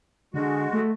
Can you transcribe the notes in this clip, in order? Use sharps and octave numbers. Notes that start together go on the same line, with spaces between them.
D3 G#3 F#4
A3